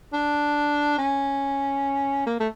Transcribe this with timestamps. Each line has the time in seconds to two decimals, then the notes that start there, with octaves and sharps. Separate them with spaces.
0.13 D4
0.98 C#4
2.26 A#3
2.40 A3